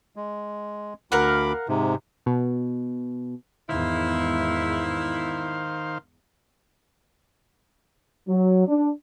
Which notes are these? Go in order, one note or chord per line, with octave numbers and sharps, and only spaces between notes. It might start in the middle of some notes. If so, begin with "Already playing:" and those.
G#3
D2 A#4 F5 F#5 B5 D6
G#2 C3
B2
E2 G#2 D#3 E4 C5 F5
F#3
D4